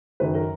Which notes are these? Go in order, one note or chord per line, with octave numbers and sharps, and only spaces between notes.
F#1 F#2 D#3 B4
A#4